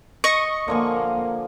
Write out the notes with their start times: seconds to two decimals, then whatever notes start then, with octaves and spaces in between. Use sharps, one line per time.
0.24 D#5 C#6
0.68 D3 F3 A#3 G#5